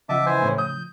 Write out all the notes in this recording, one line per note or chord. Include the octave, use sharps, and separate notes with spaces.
C#3 F3 D#5 E5 F#5 A5 D6
E3 C5 G#5
A2
D#6 G6